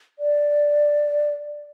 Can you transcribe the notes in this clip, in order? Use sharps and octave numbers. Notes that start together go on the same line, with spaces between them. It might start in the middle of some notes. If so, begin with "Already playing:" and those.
D5